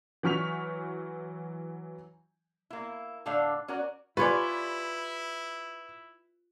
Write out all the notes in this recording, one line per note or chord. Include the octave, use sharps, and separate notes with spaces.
E3 F#3 C#6 F6 B6 F7
A#3 E4
A2 D3 A3 D4 D5 F5
C#4 F#4 A#4 D5
E4 F4 G4 B4 C#5 D5 G#5